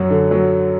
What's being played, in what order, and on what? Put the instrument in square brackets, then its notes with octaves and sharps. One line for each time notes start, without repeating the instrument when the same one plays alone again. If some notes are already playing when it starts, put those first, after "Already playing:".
Already playing: [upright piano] F#2 F#3
D3
F#3